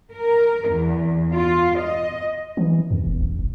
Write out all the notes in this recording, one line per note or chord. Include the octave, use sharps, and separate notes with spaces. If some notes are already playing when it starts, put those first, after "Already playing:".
A#4
E2
F4
D#5
E3
E2
E1
A1
E1